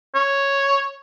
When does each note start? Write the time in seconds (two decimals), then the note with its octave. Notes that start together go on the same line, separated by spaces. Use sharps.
0.15 C#5